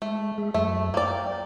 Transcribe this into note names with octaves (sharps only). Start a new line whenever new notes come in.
G#3 A3
G#3 G#4 E5
F#2 F#3 A3 E5
A#3 D5 G5